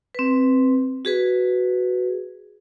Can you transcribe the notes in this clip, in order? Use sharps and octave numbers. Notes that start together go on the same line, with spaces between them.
C4 B4
F#4 G#4 B4